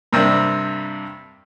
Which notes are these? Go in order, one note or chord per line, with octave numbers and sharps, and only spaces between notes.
G2 C3 G3 A#3 D4